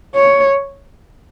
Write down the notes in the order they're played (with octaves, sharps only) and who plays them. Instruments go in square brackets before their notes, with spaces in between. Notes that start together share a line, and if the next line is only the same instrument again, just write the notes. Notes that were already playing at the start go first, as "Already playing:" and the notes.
[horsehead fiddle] C#5